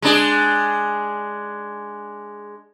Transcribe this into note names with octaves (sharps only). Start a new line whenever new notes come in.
G#3 D4 G#4